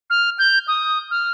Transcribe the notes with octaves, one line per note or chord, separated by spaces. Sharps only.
F6
G6
D#6
F6